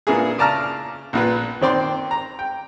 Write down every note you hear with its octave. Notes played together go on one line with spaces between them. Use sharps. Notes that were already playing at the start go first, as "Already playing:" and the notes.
A#2 A#3 B3 D4 E4 G#4
C#3 D5 A5 A#5 F6
A#1 A#2 B4
D#3 C4 D5 C6
A#5
G5